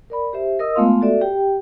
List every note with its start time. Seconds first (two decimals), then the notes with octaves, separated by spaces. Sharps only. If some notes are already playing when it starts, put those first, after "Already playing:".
0.10 A#4 D5 B5
0.33 G4 C5 E5
0.59 A#4 D#5 D#6 E6
0.75 G#3 A3 B3 F4 F5 C6
1.01 F#4 A4 D5 E5
1.21 G4 G5